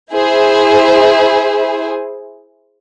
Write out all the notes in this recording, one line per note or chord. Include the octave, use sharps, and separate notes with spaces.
E4 G#4 C5